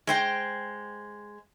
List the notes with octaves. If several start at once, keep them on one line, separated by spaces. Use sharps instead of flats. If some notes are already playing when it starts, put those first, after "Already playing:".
G#3 C5 G5